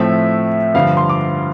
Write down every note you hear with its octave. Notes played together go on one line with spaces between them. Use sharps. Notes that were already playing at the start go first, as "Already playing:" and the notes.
Already playing: A2 F3 A3 C4 E5
G2 D3 F3 F5
C6
D6